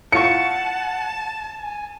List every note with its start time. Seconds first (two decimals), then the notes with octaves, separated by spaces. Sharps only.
0.12 A2 F4 F#5 A5 C#6 C#7
1.62 G#5